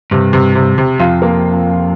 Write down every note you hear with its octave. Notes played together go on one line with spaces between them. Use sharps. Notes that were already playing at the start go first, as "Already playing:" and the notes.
G2 C3
C3
C3
C3
F2 F4
A#3